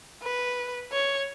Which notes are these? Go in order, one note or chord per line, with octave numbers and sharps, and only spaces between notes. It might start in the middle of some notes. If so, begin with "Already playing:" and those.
B4
C#5